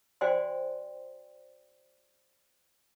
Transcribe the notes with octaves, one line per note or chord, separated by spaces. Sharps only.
F#4 C5 D5 G5 G#5 C6